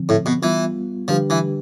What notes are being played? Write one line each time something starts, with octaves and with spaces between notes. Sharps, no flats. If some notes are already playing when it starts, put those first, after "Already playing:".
Already playing: D3 F3 C4
A2
B2
E3 G3 B3 F4
D3 F3 G3 D4 G4 B4
E3